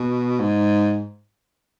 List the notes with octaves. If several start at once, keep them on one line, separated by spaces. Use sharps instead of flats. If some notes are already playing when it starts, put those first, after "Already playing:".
Already playing: B2
G#2